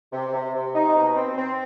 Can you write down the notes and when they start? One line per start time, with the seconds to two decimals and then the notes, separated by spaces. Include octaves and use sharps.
0.13 C3
0.33 C3
0.54 C3
0.75 D#4
0.95 B2
1.16 C4
1.37 C4